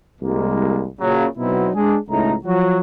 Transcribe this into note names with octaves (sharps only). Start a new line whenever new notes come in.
C2 G#3 A#3
A#2 C#3 F#3
B2 F#3 B3 C4 D#4 E4
G#3 D4 G#4
C#2 A2 A3 D#4 A#5
F3 F#3 F#4